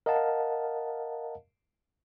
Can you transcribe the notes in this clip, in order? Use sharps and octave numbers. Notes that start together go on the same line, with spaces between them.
A#4 D#5 F5 F#5 A5